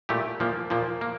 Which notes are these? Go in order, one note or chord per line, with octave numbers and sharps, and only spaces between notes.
A#2 A3 E4 G4
A#2 F3 A#3
A#2 F3 A#3
A#3